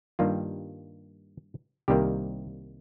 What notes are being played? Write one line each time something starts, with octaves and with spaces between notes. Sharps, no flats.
G2 D#3 G3 A#3 F4
C2 C3 D#3 G3 A#3 G4